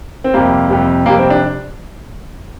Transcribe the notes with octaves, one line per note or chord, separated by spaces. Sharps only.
C4
F2 C3 G3 A#3
F2 C3 G3
F2 C3 G3 A#3
C4
D4